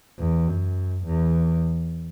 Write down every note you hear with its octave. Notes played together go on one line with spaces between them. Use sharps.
E2
F#2
E2